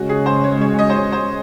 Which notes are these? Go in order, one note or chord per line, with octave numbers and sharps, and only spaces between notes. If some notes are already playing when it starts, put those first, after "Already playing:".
Already playing: C#3 G#3 C#4 F#4
G#4
C5
C#5
C#5
D#5
C5
C#5
C5